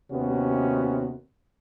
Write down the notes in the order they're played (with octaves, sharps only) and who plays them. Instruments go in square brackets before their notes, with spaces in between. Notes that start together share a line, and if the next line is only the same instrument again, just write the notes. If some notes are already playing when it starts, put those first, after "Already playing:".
[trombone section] D#2 C3 B3 C#4 F#4